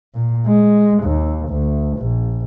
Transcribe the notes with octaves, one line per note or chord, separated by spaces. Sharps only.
A#2
G#3
D#2
D2
A#1